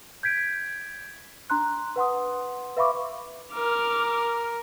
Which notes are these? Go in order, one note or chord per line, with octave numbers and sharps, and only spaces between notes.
G6 G#6 B6 D7
D4 A#5 C6 F#6
B4 F#5 C6 D#6
B4 E5 F5 B5 C#6 D6
A#4 D6 F6